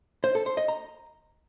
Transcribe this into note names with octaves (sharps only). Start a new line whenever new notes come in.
C5
A4
C5
D#5
A#5